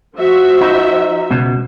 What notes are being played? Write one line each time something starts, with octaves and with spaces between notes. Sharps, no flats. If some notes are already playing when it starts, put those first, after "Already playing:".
F3 F#4 E5
D#4
C#2 B2